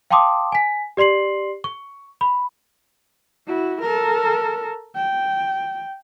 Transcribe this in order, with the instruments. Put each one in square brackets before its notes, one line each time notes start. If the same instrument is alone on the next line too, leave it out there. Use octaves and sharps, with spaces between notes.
[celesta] F5 G5 A5 C6 D6 D#6
G#5 B6
G4 D5 C6 C7 F#7
C#6
B5
[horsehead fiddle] E4 F#4
A4 A#4
G5